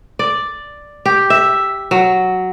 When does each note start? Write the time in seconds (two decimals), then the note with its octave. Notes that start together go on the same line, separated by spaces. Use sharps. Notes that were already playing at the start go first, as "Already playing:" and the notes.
0.19 D5
1.06 G4
1.30 E5
1.91 F#3